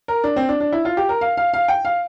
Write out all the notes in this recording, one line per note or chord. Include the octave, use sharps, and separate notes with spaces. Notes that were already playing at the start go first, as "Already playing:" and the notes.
A#4
D4
C4
D4
D4
E4
F4
G4
A#4
F5
F5
F5
G5
F5